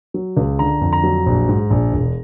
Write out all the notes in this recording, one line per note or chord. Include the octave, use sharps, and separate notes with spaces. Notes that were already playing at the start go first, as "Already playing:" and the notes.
F#3
C#2
D3 A#5
F2
A#5
F#3
A#1
G#2
A#1
E1